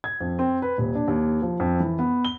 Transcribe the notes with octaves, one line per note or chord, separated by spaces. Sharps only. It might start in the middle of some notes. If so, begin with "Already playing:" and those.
G#6
F2
C4
B4
D#1
D4
D#2
F3
F2
E3
B3
G7